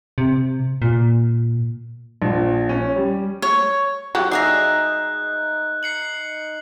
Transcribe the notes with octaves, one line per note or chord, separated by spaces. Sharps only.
C3
A#2
A#1
C#4
G3
C#5
F#3 G4 F#5
D#4 G#4 E5 A#5 F#6 G6
C7 C#7 F#7